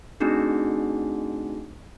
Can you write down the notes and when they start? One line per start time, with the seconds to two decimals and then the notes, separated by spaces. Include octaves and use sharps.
0.20 A3 C4 D4 D#4 F#4 G#4